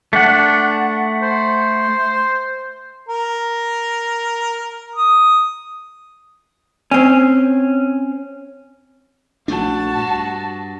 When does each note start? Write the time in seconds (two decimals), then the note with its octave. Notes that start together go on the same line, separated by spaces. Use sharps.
0.13 A3 D4 F#5
1.22 C5
3.09 A#4
4.95 D#6
6.91 C4 C#4
9.48 A#1 A3 D4 F#4 A5
9.95 G2